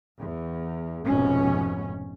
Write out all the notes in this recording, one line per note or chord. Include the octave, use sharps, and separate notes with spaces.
E2
F1 G#2 B2 C#4